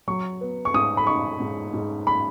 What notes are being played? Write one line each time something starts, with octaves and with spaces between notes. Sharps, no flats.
F#3 C#6
B3
C#6
G#2 D#6
B5
D#4 C#6
G#2
G#2
B5